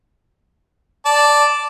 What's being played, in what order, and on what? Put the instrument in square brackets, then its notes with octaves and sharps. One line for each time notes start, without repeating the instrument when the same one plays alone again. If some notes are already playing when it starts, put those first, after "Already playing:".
[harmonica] D5 A5